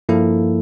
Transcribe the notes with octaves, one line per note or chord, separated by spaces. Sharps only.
G2 F3 A#3 E4 A4